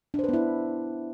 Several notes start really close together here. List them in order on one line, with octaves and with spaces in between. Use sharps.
D4 C5 B4 B3 E4